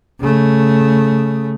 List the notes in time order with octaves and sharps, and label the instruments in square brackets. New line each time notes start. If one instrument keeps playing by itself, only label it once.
[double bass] C#3 A3